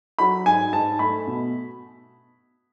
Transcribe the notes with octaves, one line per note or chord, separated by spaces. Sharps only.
F#3 B5
G#2 G#5
G#2 A5
A3 B5
B2